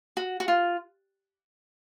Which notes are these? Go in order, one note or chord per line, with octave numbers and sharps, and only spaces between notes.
F#4
F#4
F4